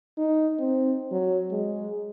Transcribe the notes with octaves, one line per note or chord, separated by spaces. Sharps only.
D#4
C4
F#3
G#3